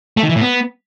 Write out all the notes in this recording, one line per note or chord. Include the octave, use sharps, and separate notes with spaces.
A3
D#3
E3
A2
B3